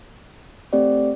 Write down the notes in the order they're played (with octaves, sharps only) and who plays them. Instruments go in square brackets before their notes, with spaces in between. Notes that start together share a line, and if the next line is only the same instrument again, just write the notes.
[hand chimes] A3 C4 G4 D5